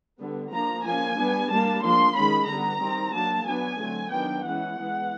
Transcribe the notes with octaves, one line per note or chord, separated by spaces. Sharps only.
D3 G3 B3
F3 A#3 D4 A#5
F3 A#3 C#4 G#5
G3 B3 D4
G3 A#3 D4 A5
F3 A#3 D4 C6
D#3 G#3 C#4 B5
D3 G3 B3 A#5
D#3 G3 C4
F#3 A#3 D4 A5
F#3 B3 D4 G#5
D3 F#3 A3 C4
D#3 F#3 B3 D4 G5
E3 G#3 C#4 F#5
E3 G#3 B3